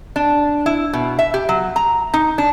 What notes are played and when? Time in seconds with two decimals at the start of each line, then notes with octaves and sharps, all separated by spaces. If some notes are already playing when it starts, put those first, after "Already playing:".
0.16 D4
0.66 E4
0.93 B2
1.19 E5
1.34 G4
1.49 F#3
1.76 A#5
2.14 D#4
2.38 D4